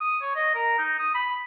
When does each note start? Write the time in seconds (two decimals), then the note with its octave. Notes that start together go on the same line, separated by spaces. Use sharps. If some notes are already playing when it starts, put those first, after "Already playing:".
0.01 D#6
0.22 C#5
0.35 D#5
0.55 A#4
0.79 D#4
0.99 D#6
1.15 B5